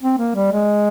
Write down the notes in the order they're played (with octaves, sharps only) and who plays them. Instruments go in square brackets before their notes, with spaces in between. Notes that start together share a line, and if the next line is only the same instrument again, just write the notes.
[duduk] C4
A#3
G3
G#3